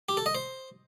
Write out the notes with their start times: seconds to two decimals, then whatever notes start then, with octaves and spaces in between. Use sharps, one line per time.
0.09 G4
0.17 A4
0.26 D#5
0.35 C5